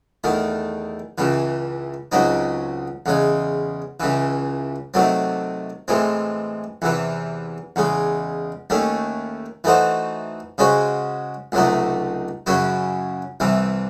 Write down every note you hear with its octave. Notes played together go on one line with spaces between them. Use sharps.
E2 D#3 A3
C#2 C#3 E3
C#2 C#3 F#3 C4 D#4
E2 C#3 G#3
C#2 C#3 E3
C3 D#3 F#3 A3 C4
A2 E3 G#3 C4
E2 C3 E3
E2 C#3 G#3
D#2 D#3 A3 C#4
E3 A3 D#4 F#4 C5
C#3 G#3 C#4 F#4 C5
C#2 C3 F#3 A3 D#4
F#2 C#3 F#3 C#4 E4
C2 C3 E3 C4